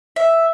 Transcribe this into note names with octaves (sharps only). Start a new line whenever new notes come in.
E5